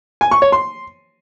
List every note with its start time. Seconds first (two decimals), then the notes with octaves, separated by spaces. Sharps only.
0.21 G#5
0.31 C#6
0.42 C#5
0.52 C6